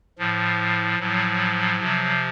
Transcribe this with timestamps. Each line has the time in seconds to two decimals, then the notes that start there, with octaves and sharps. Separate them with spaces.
0.18 A2 F3
0.99 A2 F3 F#3
1.79 C3 F3